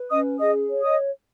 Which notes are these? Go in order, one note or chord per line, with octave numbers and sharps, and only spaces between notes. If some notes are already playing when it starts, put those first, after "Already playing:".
Already playing: B4
C#4 D#5 D#6
G#4 D#5 D#6
C#5
D#5 D#6